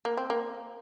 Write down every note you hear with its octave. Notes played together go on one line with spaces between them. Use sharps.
A#3
C4
A#3